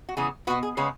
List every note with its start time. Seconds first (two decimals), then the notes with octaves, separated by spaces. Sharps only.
0.09 F#4
0.17 C#3 E3 B3 G#4
0.47 B3 F#4
0.50 B2
0.63 G#4
0.77 C#3 G#3 B3 C#5